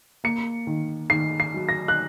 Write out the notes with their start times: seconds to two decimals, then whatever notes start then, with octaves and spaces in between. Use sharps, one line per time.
0.24 A#3 C#7
0.67 D#3
1.10 D#3 C7
1.40 C7
1.54 F#3
1.69 A#6
1.88 F#6